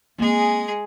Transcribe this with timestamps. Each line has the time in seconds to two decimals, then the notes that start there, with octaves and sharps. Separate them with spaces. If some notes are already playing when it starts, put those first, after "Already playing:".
0.18 G#3 A#3 C4 G#4